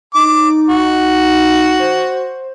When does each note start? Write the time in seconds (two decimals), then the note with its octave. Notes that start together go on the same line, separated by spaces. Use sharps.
0.15 D#4 D6
0.70 F#4
1.80 C5